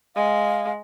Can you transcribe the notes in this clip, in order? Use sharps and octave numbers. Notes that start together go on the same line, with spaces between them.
G#3 F5